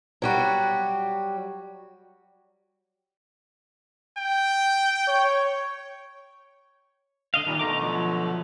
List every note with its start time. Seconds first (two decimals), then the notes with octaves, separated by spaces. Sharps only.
0.22 F#3 G3 F#4
4.18 G5
5.08 C#5
7.34 D3 D#5 F5
7.46 A#2 D#3 G3 D4
7.59 B2 D3 A3 D#5 A#5 D6
7.81 F3 F#3